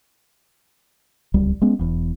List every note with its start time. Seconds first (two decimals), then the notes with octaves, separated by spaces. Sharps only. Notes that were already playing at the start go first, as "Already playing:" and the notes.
1.34 D1 C#2 G3
1.62 G#3 B3 C#4
1.79 E1 E2